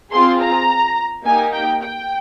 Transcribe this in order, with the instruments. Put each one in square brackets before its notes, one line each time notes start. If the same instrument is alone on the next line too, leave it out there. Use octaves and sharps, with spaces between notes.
[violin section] C4 F4 G#4 C6
A#5
A#3 D#4 G4 G#5
G5
G5